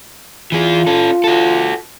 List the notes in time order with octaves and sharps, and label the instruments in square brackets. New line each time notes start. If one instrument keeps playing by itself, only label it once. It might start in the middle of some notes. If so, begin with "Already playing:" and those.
[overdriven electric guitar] E3 G#4 [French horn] F4
[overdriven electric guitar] C#4 A4
F#4 A4